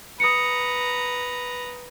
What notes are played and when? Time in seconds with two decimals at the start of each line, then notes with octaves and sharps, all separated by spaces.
0.20 B4 A#5 D#6 C#7